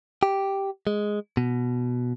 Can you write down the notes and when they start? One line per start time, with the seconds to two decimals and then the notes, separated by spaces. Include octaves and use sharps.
0.23 G4
0.87 G#3
1.37 B2